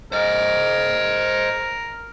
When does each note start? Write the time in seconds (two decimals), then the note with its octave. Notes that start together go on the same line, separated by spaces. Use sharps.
0.12 A#4 C5 D#5